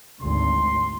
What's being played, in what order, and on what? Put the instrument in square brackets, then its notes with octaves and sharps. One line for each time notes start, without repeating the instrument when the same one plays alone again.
[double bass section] G#1 D2 [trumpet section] C6